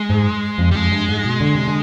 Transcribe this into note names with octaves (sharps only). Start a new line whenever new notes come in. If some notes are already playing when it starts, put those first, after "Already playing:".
Already playing: G#3
G#2
F2
G3
F2 G#3
G2
G#2
B2
D3
C3
D3